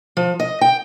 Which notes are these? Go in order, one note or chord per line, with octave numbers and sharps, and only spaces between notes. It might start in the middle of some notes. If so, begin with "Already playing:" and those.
F3
D#5
G5